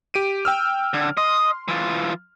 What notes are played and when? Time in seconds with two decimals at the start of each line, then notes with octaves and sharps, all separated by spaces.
0.14 G4 D7 D#7
0.45 G5 E6 F6
0.94 D3
1.17 D#5 C6
1.68 E3 F4